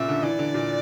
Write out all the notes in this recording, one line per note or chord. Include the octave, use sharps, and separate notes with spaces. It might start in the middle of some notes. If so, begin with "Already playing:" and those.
Already playing: A#2 C#3 E5
D3
E3 D5
D3
A#2